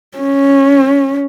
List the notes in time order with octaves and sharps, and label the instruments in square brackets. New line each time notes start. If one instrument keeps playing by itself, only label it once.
[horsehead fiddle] C#4